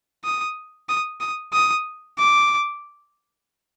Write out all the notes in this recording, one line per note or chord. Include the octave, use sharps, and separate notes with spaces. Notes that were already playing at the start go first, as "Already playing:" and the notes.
D#6
D#6
D#6
D#6
D6